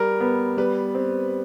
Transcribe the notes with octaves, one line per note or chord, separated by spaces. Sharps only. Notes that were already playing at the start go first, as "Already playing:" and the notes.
Already playing: G3 A#4
B3
G3 B4
C4